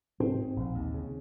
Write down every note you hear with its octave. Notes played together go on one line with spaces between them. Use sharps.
G#2 C4
G#2
A#1
D#2
C#3